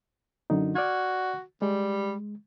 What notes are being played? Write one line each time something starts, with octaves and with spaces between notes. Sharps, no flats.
F#2 D3 D#4
F#4 D5 F6 G#6
G3 G#3